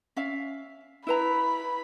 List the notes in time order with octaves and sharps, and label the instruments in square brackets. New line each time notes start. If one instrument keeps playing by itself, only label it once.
[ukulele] C#4 E5 F5
[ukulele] E4 B4 A#5 [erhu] B5